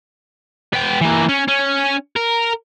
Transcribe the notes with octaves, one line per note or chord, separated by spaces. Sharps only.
B3 G5
E3 A#3
C#4
C#4
A#4